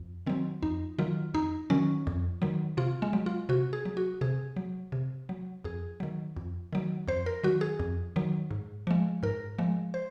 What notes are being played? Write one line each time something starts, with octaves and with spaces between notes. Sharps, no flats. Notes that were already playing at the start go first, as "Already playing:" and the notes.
Already playing: F2
D#3 F#3 C4
F2 D#4
D#3 F#3 F4
F2 D#4
D#3 F#3 C#4
F2
D#3 F#3
C3 F4
G#3
F#3
F4
C3 F#4
G#4
F#3
F#4
C3 G#4
F#3
C3
F#3
F2 G#4
D#3 F#3
F2
D#3 F#3
F2 C5
A#4
D#3 F#3 F#4
G#4
F2
D#3 F#3
G#2
F3 G#3
G#2 A#4
F3 G#3
C5